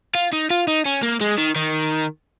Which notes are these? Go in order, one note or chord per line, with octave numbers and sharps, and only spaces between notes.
F4
D#4
F4
D#4
C#4
A#3
G#3
D#3
D#3